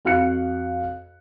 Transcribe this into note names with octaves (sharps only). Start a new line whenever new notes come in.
F2 F#4 F5 F#6 C#7